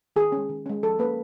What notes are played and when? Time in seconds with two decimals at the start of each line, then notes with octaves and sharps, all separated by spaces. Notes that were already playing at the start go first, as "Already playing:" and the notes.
0.16 D#3 G#4
0.32 C#4
0.37 G#3
0.49 D#3
0.66 G#3 C#4
0.83 F3 A4
0.99 A#3 C#4 B4